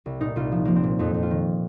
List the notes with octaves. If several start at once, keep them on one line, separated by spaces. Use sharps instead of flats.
C2
A#2 D#4
C2 F4
F3
F3 A#3
C4
A#2
F2 D#4
F2
F4
D#3